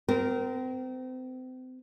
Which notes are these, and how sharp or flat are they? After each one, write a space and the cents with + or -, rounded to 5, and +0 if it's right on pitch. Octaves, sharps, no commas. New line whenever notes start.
C4 -35 A#4 +0